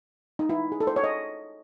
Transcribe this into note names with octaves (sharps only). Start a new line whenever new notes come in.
D#4
E4
G#4
A4
C5
C#5
D#5